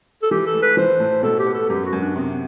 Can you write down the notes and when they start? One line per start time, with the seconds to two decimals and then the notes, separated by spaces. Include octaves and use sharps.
0.22 A4
0.31 E3 G4
0.46 A4
0.54 A3
0.62 B4
0.77 E3 C5
1.00 A2
1.23 B2 A4
1.39 G4
1.46 B3
1.54 A4
1.69 F#2 G4
1.85 F#4
1.93 F#2
2.01 D4
2.15 C3 B3
2.30 B3